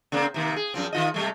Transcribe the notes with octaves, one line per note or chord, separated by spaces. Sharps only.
C#3 A#3 C4
C3 D#3 A#3
G#4
F#2 F3 C4
D#3 F4 D#5
C3 G3 A3